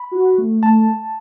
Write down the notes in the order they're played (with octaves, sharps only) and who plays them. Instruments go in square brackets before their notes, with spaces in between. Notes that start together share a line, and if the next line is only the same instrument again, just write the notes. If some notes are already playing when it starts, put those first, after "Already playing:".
Already playing: [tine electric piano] B5
[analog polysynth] F#4
A3
[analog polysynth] A3 [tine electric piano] A5